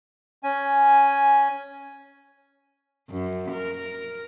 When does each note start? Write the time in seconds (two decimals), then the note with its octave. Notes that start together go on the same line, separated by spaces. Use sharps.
0.43 C#4 G#5
3.10 F#2
3.52 A#4